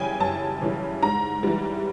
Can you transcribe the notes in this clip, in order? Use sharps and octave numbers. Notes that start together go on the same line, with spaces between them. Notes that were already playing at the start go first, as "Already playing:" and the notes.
Already playing: F#2 C#3 E3 G3 G5 G#5
F#2 A5
C#3 E3 G3
G#2 A#5
E3 G3